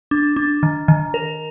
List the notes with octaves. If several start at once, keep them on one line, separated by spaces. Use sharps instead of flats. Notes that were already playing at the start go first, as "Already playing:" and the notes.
D4
D4
D#3
D#3
A#4